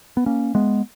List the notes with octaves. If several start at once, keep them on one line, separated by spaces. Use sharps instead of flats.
B3
A#3 C#4
G#3 B3